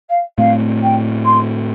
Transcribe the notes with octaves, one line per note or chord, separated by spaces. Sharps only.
F5
A2 A3 C4 F5
G5
C6